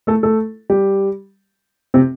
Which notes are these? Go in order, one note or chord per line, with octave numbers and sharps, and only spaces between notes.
A3 A4
A3 A4
G3 G4
C3 C4